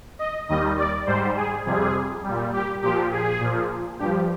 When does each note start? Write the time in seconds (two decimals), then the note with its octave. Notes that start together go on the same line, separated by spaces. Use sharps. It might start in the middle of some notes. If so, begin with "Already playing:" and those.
0.19 D#5
0.49 D#2 D#3 G3 D#5
0.78 D5
1.07 G#2 G3 C5
1.36 G#4
1.65 F2 C3 G3 G#4
2.24 A#2 G3
2.53 G4
2.82 A#2 F3 G4
3.12 G#4
3.41 A#2 F3
3.99 G2 F3 G4